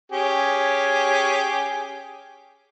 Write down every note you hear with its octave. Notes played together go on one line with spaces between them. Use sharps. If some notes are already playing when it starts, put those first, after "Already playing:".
C#4 G4 G#4